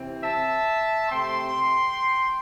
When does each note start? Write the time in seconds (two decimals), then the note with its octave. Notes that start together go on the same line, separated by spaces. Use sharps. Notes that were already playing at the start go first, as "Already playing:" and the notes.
Already playing: C3 E3 C4
0.22 E5 A5
1.09 C3 A3 C4 G5 C6